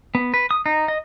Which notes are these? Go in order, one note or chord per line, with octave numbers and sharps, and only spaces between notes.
B3
B4
D#6
D#4
D#5